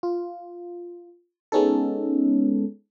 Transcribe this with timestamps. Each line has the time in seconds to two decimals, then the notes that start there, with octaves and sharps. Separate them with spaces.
0.03 F4
1.52 G#3 B3 C#4 D#4 A4